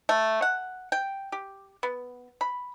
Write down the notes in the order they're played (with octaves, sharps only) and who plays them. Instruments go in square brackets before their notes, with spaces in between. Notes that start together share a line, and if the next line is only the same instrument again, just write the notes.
[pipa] A3
F#5
G5
G4
B3
B5